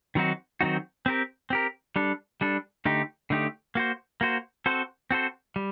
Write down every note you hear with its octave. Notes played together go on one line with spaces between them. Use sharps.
D#3 F#3 C4 D#4 F#4
D#3 F#3 C4 D#4 F#4
C4 G4 A#4
C4 G4 A#4
G3 D4 A4
G3 D4 A4
D3 A3 D#4 G4
D3 A3 D#4 G4
A#3 F#4 C5
A#3 F#4 C5
C4 F#4 A4 C5
C4 F#4 A4 C5
G3